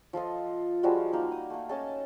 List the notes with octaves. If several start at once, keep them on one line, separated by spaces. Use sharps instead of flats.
F3 F4 A4 D#5
F3 G3 G#3 F#4
A#3 D#4
D#6
A3 A#3
C#4 A4 D#5 A5